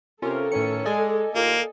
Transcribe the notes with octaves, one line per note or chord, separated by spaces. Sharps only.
C3 C#4 F4 A4 A#4
A2 D#3 E3 C#4 C#7
G#3 D5 D#5 G#5
D#2 A2 A#3 F4